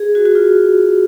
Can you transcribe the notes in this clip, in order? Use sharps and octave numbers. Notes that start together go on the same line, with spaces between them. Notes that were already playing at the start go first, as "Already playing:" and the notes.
Already playing: G#4
F#4
F#4
F4